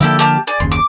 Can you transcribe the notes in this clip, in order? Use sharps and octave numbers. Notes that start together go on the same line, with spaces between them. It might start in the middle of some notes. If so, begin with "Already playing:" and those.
D3 F3 A#3 E4 G4 A4
G4 A5 F6
G#4 D5
F#1 D#2 C#3 C6
D6